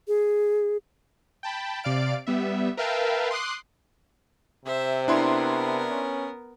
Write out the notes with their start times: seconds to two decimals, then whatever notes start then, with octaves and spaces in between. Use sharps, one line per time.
0.08 G#4
1.43 G5 A5 B5
1.83 C3 D5 F5 D7
2.27 G3 B3 E5
2.77 A#4 B4 E5 F5 G5 A5
3.31 C6 D6 D#6 F#6 C7
4.65 C3 C5 E5
5.08 B3 D4 E4 A#4 C6
5.91 C#4